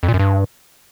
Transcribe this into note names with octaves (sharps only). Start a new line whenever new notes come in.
F2
A#2
F#2
G2